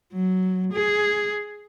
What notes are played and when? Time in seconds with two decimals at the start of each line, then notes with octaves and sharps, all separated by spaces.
0.13 F#3
0.73 G#4